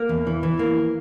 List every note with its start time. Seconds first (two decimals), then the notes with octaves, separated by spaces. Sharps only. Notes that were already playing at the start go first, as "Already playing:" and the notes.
Already playing: A#3
0.09 E2
0.27 E3
0.43 E3
0.59 A#3